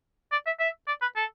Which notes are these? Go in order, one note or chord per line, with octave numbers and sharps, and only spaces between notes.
D5
E5
E5
D5
B4
A4